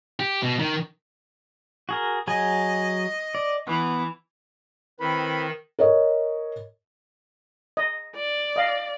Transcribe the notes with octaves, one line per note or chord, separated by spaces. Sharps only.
G4
B2
D#3
F#4 G#4 A#4
F#3 G#4 D#5 G#5
D5
E3 B3
D#3 C4 E4 B4 B5
A#4 C#5 D#5
D#5
D5
D#5 F5